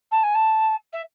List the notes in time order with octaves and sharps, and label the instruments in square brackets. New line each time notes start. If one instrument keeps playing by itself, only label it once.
[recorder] A5
G#5
A5
E5